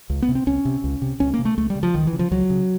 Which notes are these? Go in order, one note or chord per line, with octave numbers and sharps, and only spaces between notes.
C#2
B3
C3
C4
C#2 C#4
C3
C#2
C3
C#2 C#4
C3 A#3
A3
C#2 A3
G3
C#3
F3
C#2 D#3
E3
C#3
F3
C#2 F#3
C#3